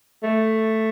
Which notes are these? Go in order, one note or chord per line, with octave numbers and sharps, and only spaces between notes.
A3